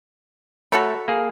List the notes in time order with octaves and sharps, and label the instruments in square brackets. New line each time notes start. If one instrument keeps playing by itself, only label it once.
[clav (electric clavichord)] A3 C#5 [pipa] F#4 A4 B5
[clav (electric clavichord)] A#3 G#4